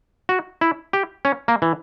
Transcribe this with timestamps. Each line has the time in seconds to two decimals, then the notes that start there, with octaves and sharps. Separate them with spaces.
0.29 F#4
0.61 E4
0.93 G4
1.25 C#4
1.48 A#3
1.62 E3